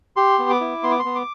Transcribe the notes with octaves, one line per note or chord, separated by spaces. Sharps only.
G4 C6
B3
D6
E4
B3 C6
D6
C6
B3
D6